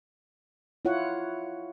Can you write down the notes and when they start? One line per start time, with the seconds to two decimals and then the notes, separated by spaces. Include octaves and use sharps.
0.85 E4 F4 C#5 F#5